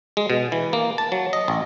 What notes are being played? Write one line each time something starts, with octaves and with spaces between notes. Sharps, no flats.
G#3
B2
E3
A#3
A5
F#3
D#5
A1